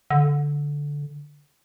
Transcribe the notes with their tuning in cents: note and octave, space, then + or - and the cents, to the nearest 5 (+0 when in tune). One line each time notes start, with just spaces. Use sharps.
D3 -10